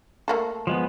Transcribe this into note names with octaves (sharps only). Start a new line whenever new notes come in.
A3 A#3 A4
F3 G#3 B3